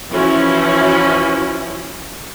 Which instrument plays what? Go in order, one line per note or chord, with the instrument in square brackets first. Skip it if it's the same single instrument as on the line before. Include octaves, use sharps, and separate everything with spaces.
[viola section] E3 F3 C#4 E4 F#4